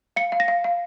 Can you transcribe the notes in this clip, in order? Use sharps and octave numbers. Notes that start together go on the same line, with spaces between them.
F5 C#7
F5
A#6
F5
F5